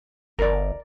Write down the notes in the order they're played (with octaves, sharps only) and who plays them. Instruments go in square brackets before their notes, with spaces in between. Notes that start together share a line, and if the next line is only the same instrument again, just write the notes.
[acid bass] G1 [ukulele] A#4 D5